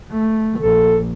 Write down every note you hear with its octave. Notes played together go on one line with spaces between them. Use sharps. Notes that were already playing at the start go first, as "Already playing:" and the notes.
A3
A#1 A4